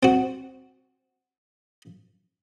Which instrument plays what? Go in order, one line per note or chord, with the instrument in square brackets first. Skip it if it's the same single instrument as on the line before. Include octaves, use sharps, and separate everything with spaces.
[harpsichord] C4 F#4